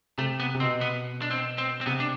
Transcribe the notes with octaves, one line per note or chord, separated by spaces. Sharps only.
C3 A3
B3
C3
B2 C4
B3
D4
C4
C4
C4
C3 B3
D4